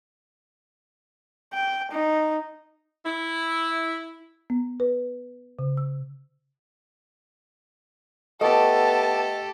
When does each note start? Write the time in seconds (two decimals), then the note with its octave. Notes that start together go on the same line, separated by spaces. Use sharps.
1.53 G5
1.91 D#4
3.06 E4
4.50 B3
4.80 B4
5.59 C#3
5.77 E6
8.41 A3 B3 G4 A4 D#5 E5 A5